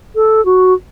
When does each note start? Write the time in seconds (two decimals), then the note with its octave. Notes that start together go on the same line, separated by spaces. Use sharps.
0.15 A4
0.45 F#4